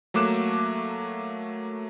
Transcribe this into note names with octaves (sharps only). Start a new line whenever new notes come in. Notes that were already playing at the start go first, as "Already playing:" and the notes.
F#3 A3 A#3 D6 F#6 E7